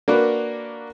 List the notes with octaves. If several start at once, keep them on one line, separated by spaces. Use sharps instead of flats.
A#3 D4 F#4 A#4 B4